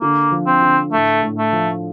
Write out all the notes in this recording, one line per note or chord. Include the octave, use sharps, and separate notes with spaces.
D3 A#3
F3
C4
D3
A2 A3
A2
A3
F3